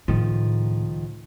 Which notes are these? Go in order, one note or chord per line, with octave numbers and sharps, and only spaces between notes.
C#2 A2 D#3 F3